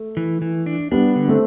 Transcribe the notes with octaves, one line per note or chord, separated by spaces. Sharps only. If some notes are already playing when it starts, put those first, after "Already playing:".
Already playing: A3
E3
E3
D4
G3 B3 D4
D3
A3 C4